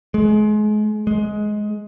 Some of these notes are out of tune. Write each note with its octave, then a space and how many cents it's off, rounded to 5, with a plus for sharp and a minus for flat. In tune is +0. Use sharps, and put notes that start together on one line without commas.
G#3 +35
G#3 +15